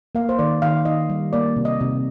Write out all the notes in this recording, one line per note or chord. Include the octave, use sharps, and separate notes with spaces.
A#3 F5
C5
D#3 D5
D#3 F5
D#3 D#5
G3
A#3 D5
C3
D#5
C3